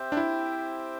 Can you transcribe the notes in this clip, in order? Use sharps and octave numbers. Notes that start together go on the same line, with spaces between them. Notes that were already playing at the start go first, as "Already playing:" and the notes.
Already playing: C4 G4 C5 E5 G5
D4
E4